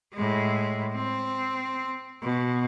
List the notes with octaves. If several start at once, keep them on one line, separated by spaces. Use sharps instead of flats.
A2 G#3
C4
B2